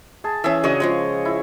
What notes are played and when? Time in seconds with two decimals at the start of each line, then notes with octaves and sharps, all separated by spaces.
0.24 G#4 A5
0.44 E3 C#4 G#4 E5
0.64 C#3 D4 F#4 C#5 D#5
0.80 C#3 F3 G#3
1.25 E4